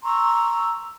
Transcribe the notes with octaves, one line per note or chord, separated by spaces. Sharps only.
A#5 C6 C#6 E6